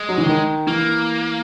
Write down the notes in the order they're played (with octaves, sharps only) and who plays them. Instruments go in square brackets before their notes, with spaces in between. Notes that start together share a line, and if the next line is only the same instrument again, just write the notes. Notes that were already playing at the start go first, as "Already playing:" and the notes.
Already playing: [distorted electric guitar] G#3
[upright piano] F#3
E3
D#3
[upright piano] E3 [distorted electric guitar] A#3